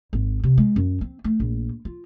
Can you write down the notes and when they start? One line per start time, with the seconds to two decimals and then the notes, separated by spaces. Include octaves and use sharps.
0.13 G#1
0.43 C3
0.58 G#3
0.76 F#2
1.01 C4
1.24 A3
1.40 A#1
1.85 F4